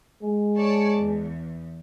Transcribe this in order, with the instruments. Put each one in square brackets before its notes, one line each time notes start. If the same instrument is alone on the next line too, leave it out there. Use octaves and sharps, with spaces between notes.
[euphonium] G#3
[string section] C#5 D5 A5
E2